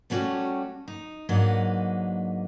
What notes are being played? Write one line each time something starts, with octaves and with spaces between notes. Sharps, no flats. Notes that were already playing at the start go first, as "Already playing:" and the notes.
G3 A3 B3 C#4 F#4 G4
D#4
G#2 F#3 A#3 D4 B4 D#5